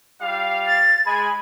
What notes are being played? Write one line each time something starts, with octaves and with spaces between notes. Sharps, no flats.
G3 F4 F5
A6
G#3 G#5 B5